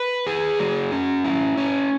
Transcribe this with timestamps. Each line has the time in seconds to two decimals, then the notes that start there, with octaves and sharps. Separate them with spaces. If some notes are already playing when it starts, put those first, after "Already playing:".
Already playing: B4
0.27 G#4
0.59 F#3
0.92 C#4
1.24 E4
1.57 C#4